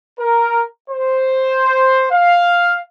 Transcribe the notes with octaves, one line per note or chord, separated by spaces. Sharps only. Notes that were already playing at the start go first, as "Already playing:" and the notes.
A#4
C5
F5